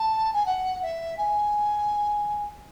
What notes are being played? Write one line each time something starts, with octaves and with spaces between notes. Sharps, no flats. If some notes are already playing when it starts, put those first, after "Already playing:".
Already playing: A5
G#5
F#5
E5
G#5